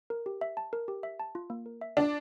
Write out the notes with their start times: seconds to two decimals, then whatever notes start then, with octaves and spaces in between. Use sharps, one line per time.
0.10 A#4
0.26 G4
0.41 E5
0.57 A5
0.73 A#4
0.88 G4
1.03 E5
1.20 A5
1.35 F4
1.50 A#3
1.66 A#4
1.81 E5
1.97 D4 F4